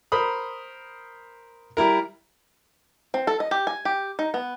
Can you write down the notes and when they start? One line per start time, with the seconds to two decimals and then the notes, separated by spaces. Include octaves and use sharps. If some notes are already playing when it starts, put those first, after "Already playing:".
0.12 A#4 C5 B5 D#6
1.77 G3 E4 A#4
3.14 C4
3.27 A4
3.40 D#5
3.51 G4
3.67 G#5
3.85 G4
4.19 D#4
4.34 B3